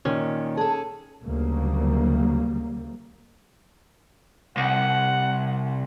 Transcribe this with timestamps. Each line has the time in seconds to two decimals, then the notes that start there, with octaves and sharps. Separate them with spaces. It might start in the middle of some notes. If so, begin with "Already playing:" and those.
0.05 A#2 D#3 C#4
0.57 G#4 A4 A5
1.25 D2 C#3 F#3 G3 A#3
4.57 C2 F#5